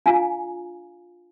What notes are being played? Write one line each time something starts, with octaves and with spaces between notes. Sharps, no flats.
D4 F4 F5 G#5 A#5